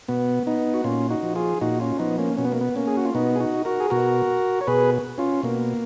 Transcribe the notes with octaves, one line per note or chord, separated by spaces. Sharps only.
B2 B3
B3 D#4
F#4
A#2 C#4 F4
D#4 F#4
F3
F4 G#4
A#2 D#4 F#4
C#4 F4
F3 B3 D#4
A#3 C#4
B2 C#4
B3
A#3
B3
A#3 C#4
G#4
F#4
F4
B2 B3 D#4
G#4
D#4 F#4
F#4 A#4
G#4
B2 F#4 A#4
C#5
B2 G#4 B4
C#4 F4
B2 A#3